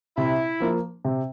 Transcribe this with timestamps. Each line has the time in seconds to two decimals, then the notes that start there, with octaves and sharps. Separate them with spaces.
0.17 C3 E4
0.60 F3 A#3
1.05 C3